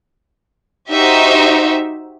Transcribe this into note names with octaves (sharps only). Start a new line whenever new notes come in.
D#4 F#4 G4 C5 E5